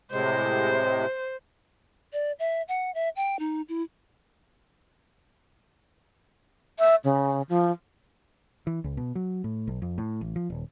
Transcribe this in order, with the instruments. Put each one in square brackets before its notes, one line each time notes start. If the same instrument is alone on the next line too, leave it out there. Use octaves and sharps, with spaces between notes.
[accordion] A2 C3 G#3 [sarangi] C5
[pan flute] D5
E5
F#5
E5
G5
D#4
E4
[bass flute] E5
C#3
F3
[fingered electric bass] E3
C#2
B2
F#3
A2
B1
F2
A2
A1
F3
D#1